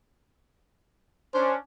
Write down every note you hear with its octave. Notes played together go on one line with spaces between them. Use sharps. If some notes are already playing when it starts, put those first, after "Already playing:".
C#4 D4 C5